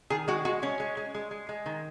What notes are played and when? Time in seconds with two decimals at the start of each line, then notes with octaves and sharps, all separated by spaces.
0.10 D#3 G#4
0.28 G#3 F#4
0.45 G#3 F#4
0.62 G#3 C#4
0.80 G#3
0.97 G#3
1.14 G#3
1.31 G#3
1.49 G#3
1.66 D#3